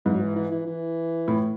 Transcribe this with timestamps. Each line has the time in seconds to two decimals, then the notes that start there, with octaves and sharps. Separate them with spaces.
0.05 G#2 E3
0.14 F#3
0.20 E3
0.36 E3
0.51 E3
0.66 E3
1.28 A2